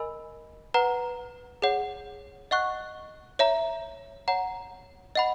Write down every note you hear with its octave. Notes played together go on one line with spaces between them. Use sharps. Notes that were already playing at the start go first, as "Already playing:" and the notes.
Already playing: A#4 D#5 G#5 B5 E6
B4 F#5 A#5
G#4 C#5 F#5
D#5 F#5 C#6 F#6
C#5 E5 A#5
C#5 F#5 A#5
D#5 F#5 B5